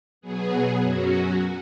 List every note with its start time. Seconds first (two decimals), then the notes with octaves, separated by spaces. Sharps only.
0.21 B2 F#3 B3 G#4
0.78 F#2 F#3 C#4 F#4